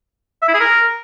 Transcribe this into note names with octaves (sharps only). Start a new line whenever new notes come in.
E5
E4
G#4
A#4